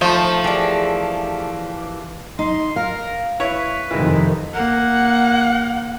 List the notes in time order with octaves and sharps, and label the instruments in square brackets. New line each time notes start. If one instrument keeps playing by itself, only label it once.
[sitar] F3 [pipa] A3 [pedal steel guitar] D#4 C5
[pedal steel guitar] E3 G4 A#4 [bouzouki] G#4 D5
[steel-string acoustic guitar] D#4 [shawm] C6
[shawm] A#4 [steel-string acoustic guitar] F5
[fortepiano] E4 C#5 [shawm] B4
[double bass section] F2 C3 D#3 [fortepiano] E3 G#3
[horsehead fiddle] A#3 F#5